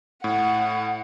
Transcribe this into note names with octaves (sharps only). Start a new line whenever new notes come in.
A2 F#5